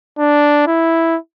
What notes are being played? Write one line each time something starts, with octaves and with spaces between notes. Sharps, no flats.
D4
E4